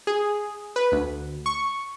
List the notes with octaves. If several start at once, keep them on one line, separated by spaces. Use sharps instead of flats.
G#4
B4
D2
C#6